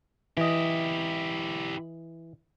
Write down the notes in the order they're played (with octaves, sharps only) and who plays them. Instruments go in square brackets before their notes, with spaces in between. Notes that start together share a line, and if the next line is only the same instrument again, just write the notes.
[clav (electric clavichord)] E3 D#5 [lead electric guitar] E4 G4